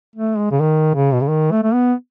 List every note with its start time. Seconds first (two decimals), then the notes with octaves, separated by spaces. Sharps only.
0.16 A3
0.38 G#3
0.51 C#3
0.60 D#3
0.95 C#3
1.13 B2
1.21 C#3
1.29 D#3
1.51 A3
1.63 A3
1.73 B3